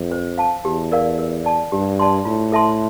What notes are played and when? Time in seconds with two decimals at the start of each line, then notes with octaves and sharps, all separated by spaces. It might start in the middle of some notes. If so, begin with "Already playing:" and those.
Already playing: F2
0.11 C5
0.38 F5 A5
0.65 E2 G4
0.91 A#4 D5 F5
1.18 A#4
1.45 D5 A5
1.72 G2 G4
1.99 D5 A5 C6
2.25 A2 F4
2.52 A4 E5 A5 C6